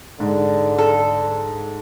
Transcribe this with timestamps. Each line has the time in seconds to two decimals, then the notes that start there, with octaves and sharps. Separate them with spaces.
0.20 G#2 D3
0.78 A4